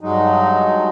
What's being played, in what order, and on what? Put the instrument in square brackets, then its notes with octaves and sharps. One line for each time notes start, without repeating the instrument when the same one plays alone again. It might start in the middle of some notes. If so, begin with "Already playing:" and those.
[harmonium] G2 F#3 G#3 D#4